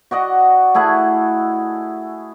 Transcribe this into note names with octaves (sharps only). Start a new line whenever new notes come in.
F#4 D5 D#5 F#5
A3 E4 G#4 F#5